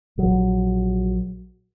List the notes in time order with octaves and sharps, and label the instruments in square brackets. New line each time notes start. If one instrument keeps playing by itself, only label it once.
[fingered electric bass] A#1 F#3